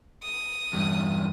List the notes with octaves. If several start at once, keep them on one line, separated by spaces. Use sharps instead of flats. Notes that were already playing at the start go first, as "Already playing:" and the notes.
D#6
E2 G2